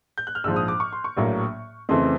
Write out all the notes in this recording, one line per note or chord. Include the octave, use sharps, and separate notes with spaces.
G6
F#6
F6
A#1 G#2 F3 E6
D#6
D6
C#6
C6
C#6
A#1 A2 F#3 A#3
F2 C#3 E3 A3 C4 C6